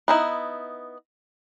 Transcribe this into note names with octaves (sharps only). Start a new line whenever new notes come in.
B3 D#4 E4